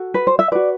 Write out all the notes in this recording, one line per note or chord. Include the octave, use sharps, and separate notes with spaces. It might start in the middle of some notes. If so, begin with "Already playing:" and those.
Already playing: F#4 A4
B4
C5
E5
F#4 B4 D5